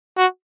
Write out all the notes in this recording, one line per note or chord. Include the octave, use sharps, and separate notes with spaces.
F#4